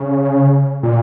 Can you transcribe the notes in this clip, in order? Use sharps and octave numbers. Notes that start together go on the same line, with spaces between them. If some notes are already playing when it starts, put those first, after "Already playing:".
Already playing: C#3
A#2